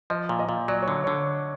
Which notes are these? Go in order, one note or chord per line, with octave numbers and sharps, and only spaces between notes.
F3 D#5
A#2
D#5
A#2
F#3 D5
C#5
D3
C#5
D3